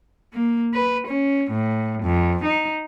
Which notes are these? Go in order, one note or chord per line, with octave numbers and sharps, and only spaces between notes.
A#3
B4
C#4
A2
F2
D#4